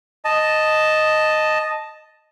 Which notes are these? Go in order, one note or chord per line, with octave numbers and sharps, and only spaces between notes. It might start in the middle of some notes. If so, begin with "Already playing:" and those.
D#5 A5